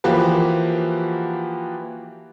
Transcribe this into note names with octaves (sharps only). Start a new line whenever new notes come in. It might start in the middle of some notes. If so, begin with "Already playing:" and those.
E3 F3 A#3 F#4 G4 B4